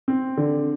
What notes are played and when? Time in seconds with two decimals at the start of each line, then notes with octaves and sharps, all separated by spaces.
0.08 C4
0.37 D3